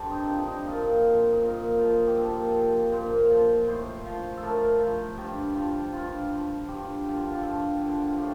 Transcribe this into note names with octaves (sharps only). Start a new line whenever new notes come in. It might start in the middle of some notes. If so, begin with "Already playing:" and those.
Already playing: G2 G4 A4 C5
D#4
C4
F3 D4
D#4
A#2 F4
F3
D#4
A#2 F4
F3
G4
A#2 A4
F3
A#2 C5
F3
A2 C5
F3
A4
A2 A#4
F3
G2 G4
F3
G2 F4
F3
G2 G4
D3 F3
F4
G4
G2 A4
D3 F3
F4
A2 G4